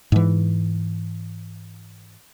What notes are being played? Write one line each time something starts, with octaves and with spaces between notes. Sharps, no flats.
G#2 E3